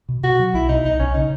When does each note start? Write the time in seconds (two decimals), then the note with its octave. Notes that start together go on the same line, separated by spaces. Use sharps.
0.09 B2
0.23 B2 F#4
0.39 F#3
0.54 B1 E4
0.69 B2 D#4
0.84 B1 D#4
1.00 B1 C#4
1.14 C#3 D#4